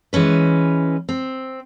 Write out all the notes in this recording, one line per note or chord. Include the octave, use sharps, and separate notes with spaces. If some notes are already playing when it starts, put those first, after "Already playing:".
E3 G#3 C#4 B4
C4